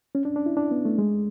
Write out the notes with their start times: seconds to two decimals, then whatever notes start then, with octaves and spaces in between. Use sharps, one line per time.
0.15 C#4
0.25 D4
0.36 D4
0.46 E4
0.57 D4
0.71 B3
0.85 A3
0.98 G#3